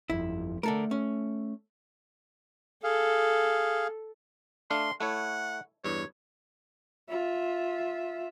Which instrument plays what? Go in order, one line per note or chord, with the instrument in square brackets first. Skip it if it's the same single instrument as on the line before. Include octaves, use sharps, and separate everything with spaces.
[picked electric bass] G1 F2 [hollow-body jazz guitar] E4
[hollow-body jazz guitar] D3 A4 A#4 [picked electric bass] A3
[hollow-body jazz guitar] C#4
[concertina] G#4 F5 [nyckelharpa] A4
[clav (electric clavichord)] A3 D4 F5 [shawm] C6
[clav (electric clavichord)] A3 E4 C#5 [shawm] F#5
[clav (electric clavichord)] E2 G2 [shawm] C#5
[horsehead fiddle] F4 E5